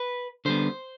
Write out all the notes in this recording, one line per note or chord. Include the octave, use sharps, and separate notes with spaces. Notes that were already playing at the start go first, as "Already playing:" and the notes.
Already playing: B4
D3 G3 B3 C5